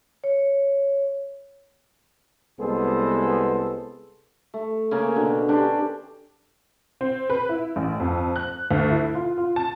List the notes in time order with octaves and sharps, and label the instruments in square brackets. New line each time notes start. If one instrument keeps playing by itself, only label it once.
[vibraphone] C#5
[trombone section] C2 G#3 B3 G#4 A4 C5
[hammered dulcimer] A3
C#3 A#3 C#4
B2 D3
C#4 D4 G4 C5
[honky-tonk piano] C4
B4
E4
A1
F2
F#6
D2
E4
F4
F4
A5